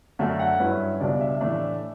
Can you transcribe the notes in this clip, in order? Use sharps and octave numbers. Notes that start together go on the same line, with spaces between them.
F#2 D3 A3 E5
F#5
G2 F#3 C#4 E4 B4
C#2 B2 G3 D4 D5
E5
A2 E3 A3 D4